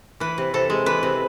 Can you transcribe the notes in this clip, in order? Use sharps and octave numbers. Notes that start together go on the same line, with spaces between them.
E3 B4
C3
C3 A4
G#3
E3 B4
C3